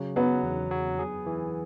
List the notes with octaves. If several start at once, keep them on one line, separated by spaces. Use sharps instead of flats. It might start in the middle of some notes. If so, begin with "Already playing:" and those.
Already playing: C#3 F#3
F#3 B3
E2
F#3
G#4
E3